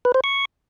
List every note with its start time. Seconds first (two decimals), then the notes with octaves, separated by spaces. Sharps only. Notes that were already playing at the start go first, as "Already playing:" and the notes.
0.05 B4
0.14 C5
0.24 C#6